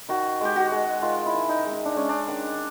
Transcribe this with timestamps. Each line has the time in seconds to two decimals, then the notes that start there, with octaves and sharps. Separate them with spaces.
0.09 D#3 F#4
0.41 G#3 G4
0.56 F#4
0.71 G#3
1.02 D#3 F4
1.26 E4
1.34 D#3
1.49 D#4
1.65 G#3
1.73 D#4
1.85 D4
1.96 G#3 C#4
2.09 D4
2.27 D#3